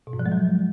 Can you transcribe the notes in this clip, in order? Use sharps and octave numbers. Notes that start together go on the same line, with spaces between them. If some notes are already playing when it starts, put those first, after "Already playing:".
B2
G#2
F3
G#3
F#3